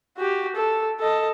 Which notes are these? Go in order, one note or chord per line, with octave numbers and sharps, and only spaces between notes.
F#4 G4
A4
A4 D#5